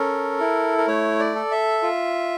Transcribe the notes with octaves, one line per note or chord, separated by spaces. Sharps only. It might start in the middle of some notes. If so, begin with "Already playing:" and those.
Already playing: C#4 A4 A#4
E4
A#4
A3 C#5
D5
A4
E5
F4